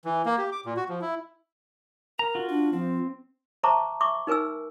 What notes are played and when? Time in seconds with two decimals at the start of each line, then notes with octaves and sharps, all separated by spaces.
0.05 E3
0.26 A#3
0.38 G4
0.52 D6
0.65 A#2
0.77 F#4
0.89 F3
1.01 E4
2.19 A#4 A#5
2.35 F4 F#4
2.50 D4
2.73 F3 C4
3.63 C5 E5 A5 A#5 C#6 D6
4.01 E5 C#6 D6
4.27 D#4 A#4 B4 G#5 E6